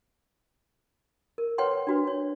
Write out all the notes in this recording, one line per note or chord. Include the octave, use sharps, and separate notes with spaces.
A#4
B4 C#5 F#5 G5 C6
D4 F#4 B4
C#5